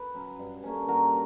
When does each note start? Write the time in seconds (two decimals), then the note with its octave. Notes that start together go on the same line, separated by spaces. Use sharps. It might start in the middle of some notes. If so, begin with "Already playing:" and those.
Already playing: B4
0.14 F#3 C#4
0.39 G2
0.64 D3 A#3 C#4
0.88 G2 F#4 A#4